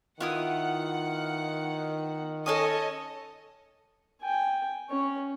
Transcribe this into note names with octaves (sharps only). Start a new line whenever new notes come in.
D#3 B3 E4 F4 F#5 D#6
C#4 A4 C#5 D#5 G#5 A5 D#6
G5 G#5
C#4 C#5